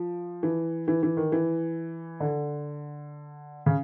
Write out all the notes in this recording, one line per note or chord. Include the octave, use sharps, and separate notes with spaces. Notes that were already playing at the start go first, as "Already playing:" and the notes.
Already playing: F3
E3
E3
E3
D#3
E3
D3
C#3